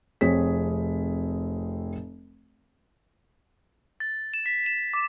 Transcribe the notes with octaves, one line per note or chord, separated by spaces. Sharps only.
F1 C4 G#4 C#5 B6
A6
E7
B6
E7
D6